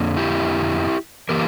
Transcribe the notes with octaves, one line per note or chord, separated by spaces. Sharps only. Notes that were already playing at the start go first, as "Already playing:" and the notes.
Already playing: F2 D3 F3 A#3
E4 G4
E3 A#3 G4 A#4